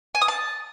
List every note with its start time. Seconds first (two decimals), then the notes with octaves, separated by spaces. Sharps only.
0.15 G#5
0.21 D#6
0.28 A5